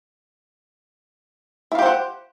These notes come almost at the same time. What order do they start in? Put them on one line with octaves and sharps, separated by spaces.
E4 F5 G4 C5 F#5